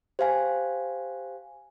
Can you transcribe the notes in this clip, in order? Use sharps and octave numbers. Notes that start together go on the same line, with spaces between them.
G4 C5 F5 G#5